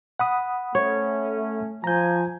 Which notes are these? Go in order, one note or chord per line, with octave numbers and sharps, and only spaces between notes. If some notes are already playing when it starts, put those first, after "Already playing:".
F#5 B5 D#6
A3 C#4 C#5
F3 G#5 A#5 G6